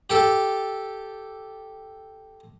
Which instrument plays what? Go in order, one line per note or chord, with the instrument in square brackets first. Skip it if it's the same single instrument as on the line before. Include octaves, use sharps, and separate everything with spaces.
[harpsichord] G4 A4